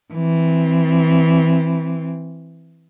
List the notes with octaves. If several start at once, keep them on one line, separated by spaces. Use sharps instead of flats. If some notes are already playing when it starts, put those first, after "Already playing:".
E3 C4